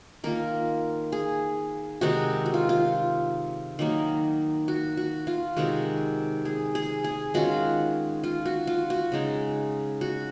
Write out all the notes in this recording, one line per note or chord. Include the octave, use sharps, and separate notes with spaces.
D#3 A#3 F4 A#4
G#4
C3 D#3 G#3 D#4 F#4
F#4
F4
F4
D#3 F#3 A#3 D#4
F#4
F#4
F4
C3 D#3 G#3 F#4
G#4
G#4
G#4
D#3 G#3 C#4 F4 F#4
F4
F#4
F4
F#4
C#3 G#3 D#4
F#4